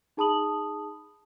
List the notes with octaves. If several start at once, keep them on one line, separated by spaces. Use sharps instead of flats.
D#4 G#4 A5 B5 D#6 F#7